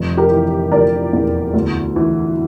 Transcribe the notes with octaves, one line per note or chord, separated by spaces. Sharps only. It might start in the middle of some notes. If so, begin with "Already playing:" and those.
Already playing: F1
G4 A#4
E3
F1 A#4 D5
E2
D2
E3